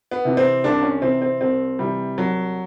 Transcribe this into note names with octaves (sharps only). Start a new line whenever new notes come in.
B3
C3 E3
C4
C2 D4
C#4
C3 E3 C4
C4
C2 C4
C3 E3 G3
C2 F#3